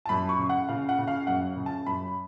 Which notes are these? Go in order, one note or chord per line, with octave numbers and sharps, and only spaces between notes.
A5
F#2 B5
C#6
C#3
F#5
C#3 F5
F#5
C#3
F5
F#2 F#5
C#3
A5
F#2 B5